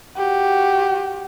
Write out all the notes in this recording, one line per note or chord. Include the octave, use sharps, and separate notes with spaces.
F#4 G4